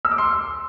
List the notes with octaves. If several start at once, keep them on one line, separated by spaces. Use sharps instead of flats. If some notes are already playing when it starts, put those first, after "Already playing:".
E6
D6
C6